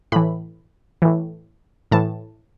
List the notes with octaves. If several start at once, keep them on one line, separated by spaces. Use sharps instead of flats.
A2 E3 B5
A2 E3
A2 E3 A5